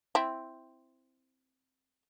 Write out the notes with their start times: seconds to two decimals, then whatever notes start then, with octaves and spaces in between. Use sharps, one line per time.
0.15 C4 E4